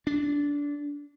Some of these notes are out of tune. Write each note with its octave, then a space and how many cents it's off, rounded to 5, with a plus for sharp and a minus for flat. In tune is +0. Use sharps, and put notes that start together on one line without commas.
D4 -20